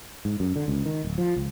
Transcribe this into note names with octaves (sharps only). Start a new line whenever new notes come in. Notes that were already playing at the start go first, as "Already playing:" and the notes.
G#2
F#2
D3
C#2
D#3
D1
F3
C#2